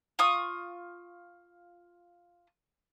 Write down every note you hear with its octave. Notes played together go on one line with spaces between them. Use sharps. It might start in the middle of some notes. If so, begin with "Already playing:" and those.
F4 C#6 D#6